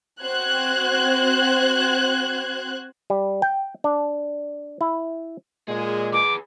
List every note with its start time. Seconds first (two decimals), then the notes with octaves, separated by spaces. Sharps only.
0.22 C4 F#4 C5 F#6 G#6
3.10 G3
3.42 G5
3.84 D4
4.81 E4
5.68 A#2 G#3 G#4
6.13 G#4 B4 D6